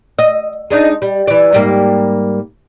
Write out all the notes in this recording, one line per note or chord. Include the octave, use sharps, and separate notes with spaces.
D#5
G#3 D4 D#4
G3
E3 D5
G#2 G3 A#3